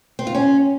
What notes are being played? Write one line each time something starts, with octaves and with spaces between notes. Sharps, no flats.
C4
F4
C#4